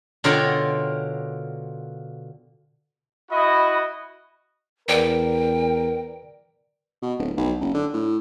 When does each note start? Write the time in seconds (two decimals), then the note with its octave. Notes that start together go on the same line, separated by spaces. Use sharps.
0.24 B2 D3 F4 A#4 C#5 G5
3.30 E4 F#4 D#5 B5
4.89 E2 A#4 B4 D5 G5
7.02 B2
7.19 D1
7.37 B1
7.61 F#1
7.74 D3
7.94 A2